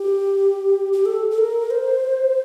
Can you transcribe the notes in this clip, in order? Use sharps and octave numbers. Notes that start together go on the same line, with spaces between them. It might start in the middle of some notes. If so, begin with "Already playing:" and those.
Already playing: G4
G4
A4
A4
A#4
C5